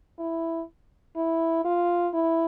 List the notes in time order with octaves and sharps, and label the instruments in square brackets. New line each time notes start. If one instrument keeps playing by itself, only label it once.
[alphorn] E4
E4
F4
E4